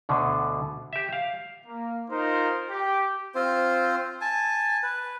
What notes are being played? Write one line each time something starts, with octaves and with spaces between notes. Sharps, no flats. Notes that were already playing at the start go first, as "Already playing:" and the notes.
D2 B2 D3
G4 E5
F5
A#3
D#4 F4 A#4 C5
G4
C4 F4 C5
G#5 A5
B4